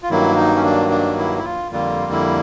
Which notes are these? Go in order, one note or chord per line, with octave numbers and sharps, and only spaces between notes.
F4
G2 D#3 F#3 A#3 E4
D#4
C#4
D4
D4
E4
E4
F4
F2 D3 G3 A#3 F4
E4